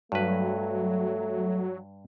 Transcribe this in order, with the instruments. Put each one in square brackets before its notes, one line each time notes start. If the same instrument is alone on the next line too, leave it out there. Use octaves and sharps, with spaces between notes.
[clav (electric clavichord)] G2 B4 [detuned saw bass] F#3 [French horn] A3